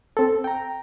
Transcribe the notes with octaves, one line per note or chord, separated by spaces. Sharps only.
C4 A4
G5 A#5